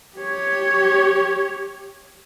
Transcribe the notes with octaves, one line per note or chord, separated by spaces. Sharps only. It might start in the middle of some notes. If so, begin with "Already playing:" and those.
G4 C#5